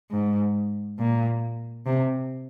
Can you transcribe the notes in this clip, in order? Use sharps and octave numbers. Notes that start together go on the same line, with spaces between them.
G#2
A#2
C3